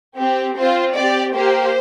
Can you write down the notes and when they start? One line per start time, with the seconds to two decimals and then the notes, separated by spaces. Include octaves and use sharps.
0.19 C4 G4
0.56 C4 F4 C5
0.95 C4 G4 D5
1.33 A#3 G4 C5